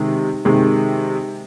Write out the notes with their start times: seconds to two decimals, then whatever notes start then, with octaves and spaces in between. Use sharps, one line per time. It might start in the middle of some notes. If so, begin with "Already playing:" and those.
Already playing: C3 D#3 G#3
0.45 C3 D#3 G#3